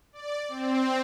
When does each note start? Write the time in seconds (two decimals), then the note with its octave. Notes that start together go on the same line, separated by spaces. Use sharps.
0.13 D5
0.49 C4